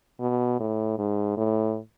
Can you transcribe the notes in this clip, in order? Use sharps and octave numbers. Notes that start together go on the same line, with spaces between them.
B2
A2
G#2
A2